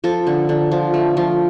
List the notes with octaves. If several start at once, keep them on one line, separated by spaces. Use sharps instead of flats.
F3 A4
D3
D3
F3
A3
F3